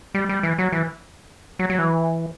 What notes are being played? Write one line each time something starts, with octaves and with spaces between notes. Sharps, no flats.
G3
G3
E3
F#3
E3
F#3
F#3
E3